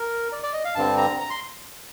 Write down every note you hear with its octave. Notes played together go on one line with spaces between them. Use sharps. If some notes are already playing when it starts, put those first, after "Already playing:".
Already playing: A#4
D5
D5
D#5
F5
G2 D3 G3 C4 A5
A#5
A#5
C6